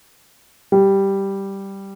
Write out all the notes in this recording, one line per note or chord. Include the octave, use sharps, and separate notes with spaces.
G3